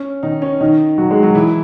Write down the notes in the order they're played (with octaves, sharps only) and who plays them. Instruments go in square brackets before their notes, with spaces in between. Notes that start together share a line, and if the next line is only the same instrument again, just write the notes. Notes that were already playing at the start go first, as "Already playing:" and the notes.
Already playing: [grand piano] C#4
D#3 D#4
C#4
D#3 D#4
F#3 F#4
G#3 G#4
F#3 F#4
E3 E4